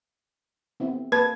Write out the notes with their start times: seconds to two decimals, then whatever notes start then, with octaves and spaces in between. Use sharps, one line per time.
0.80 B3 C4 E4
1.12 A#3 B4 A5 G#6